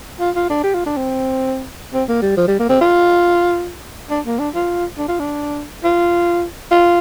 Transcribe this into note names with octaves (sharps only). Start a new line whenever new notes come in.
F4
F4
D4
G4
F4
D4
C4
C4
A#3
G3
F3
G3
A#3
C4
F4
D4
A#3
D4
F4
D4
F4
D4
F4
F4